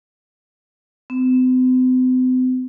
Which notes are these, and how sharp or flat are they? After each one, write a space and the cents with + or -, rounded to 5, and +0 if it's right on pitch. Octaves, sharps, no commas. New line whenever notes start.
C4 -45